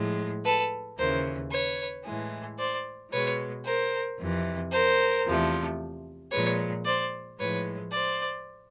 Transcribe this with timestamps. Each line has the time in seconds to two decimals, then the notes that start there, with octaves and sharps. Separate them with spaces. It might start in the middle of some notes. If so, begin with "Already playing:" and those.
Already playing: A2 F3 G#3
0.44 A4 B4
0.98 D#2 C#3 E3 A#4 C5
1.51 B4 C#5
2.05 A2 E3 G#3
2.59 C5 D5
3.11 B2 G#3 B4 C#5
3.65 A#4 C5
4.18 F2 C3 E3
4.72 A#4 C5
5.25 E2 C3 F3 A3
6.32 A#2 F3 G#3 B4 C#5
6.86 C5 D5
7.39 A2 F3 G#3 B4 C#5
7.92 C5 D5